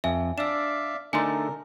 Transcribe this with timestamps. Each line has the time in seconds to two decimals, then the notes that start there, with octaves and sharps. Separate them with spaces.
0.04 F2 E5 G#5
0.38 D4 D5 E5 F5 E6 E7
1.13 D3 A3 D#4 A#4 G#5 C6